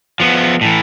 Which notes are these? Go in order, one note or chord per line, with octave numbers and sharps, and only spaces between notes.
F3 B3
A2 E3